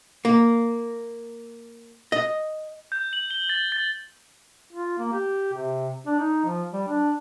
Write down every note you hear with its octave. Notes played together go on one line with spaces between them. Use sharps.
A#3
D#5
G6
F#7
G7
A6
A6
F4
A#3
G4
C3
D4
D#4
F3
G3
D4